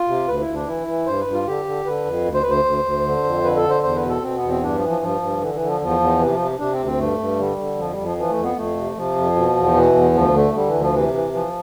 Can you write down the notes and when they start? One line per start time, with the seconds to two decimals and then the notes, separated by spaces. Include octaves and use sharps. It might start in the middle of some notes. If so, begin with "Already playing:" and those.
Already playing: F4
0.08 C3
0.28 D2 B4
0.41 E4
0.47 D2
0.54 D4
0.67 E3 E4
0.87 E3
1.06 G2 C5
1.20 B4
1.26 G2
1.33 F4
1.46 D3 G4
1.65 D3
1.85 D3 B4
2.05 F2
2.25 D2
2.34 C5
2.42 D2 B4
2.50 C5
2.64 D2
2.84 D2
3.04 D3
3.24 F2
3.43 D3 B4
3.57 A4
3.64 D3
3.70 C5
3.83 E2 C5
3.96 B4
4.03 B2
4.09 A4
4.22 B2 C4
4.36 B3
4.42 E2
4.48 C4
4.62 G2 D4
4.75 F3
4.82 E3
4.88 F3
5.01 G2 F3
5.21 G2
5.41 D3 E3
5.54 E3
5.60 D3
5.67 F3
5.81 E2 F3
6.00 E2
6.19 C3 E3
6.33 F3
6.40 C3
6.59 C3 D4
6.72 C4
6.79 D2
6.86 C4
6.98 G2 A3
7.18 G2
7.38 D3 G3
7.58 D3
7.78 F2 F3
7.91 G3
7.98 F2
8.04 F3
8.17 E3 F3
8.30 A3
8.37 F2
8.43 B3
8.56 F2 A3
8.76 C3
8.96 C3 F3
9.16 F2
9.36 B2
9.56 E2
9.75 B2 E3
9.95 E2
10.14 D2 F3
10.34 D3 A3
10.54 D3 G3
10.67 E3
10.74 D2
10.81 F3
10.93 C3 E3
11.13 E3
11.33 E3 F3